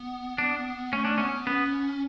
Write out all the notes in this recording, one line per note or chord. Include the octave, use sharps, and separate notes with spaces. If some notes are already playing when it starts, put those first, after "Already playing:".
Already playing: B3
D4
A3 C#4
D4
B3 C#4
B3 C#4